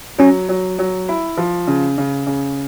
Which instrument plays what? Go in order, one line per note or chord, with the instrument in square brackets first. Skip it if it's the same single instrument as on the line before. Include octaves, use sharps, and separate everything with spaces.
[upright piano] F#3 [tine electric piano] C#4
[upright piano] F#3
F#3
E4
F3
C#3
C#3
C#3